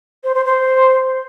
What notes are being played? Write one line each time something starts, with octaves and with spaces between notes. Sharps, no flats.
C5
C5
C5